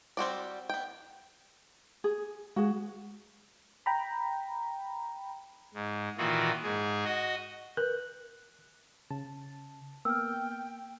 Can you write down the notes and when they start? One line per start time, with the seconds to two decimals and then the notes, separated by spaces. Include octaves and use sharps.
0.17 G3 C4 F#4 D5
0.69 B3 G5
2.04 G#4
2.56 G#3 F#4 G#4
3.86 G5 A#5 B5
5.74 G#2
6.18 A#2 D#3 E3 F4 F#4
6.63 G#2 G#4
7.05 F#4 D#5
7.77 A#4 B4 F#6
9.11 C#3 A5
10.05 A#3 B3 G5 E6 F6